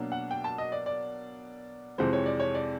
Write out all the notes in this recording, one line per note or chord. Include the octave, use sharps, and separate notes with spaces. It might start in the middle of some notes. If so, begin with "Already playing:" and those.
Already playing: B2 F#3 A#3 D4
F#5
G5
A5
D#5
D5
D5
F2 C3 E3 G#3 C5
C#5
D5
C#5
D5